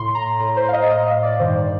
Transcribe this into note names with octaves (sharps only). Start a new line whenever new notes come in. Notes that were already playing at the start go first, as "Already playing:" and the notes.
Already playing: A2 C6
A#5
A2 A#5
C5
F5
D#5
A2 D#5
F5
D5
G2 D#3 C5
D5